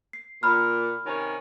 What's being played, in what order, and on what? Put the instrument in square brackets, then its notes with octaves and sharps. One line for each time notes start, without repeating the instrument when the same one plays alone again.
[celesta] C7
[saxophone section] A#2 [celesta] B5 F6
[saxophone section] C3 D#3 C#4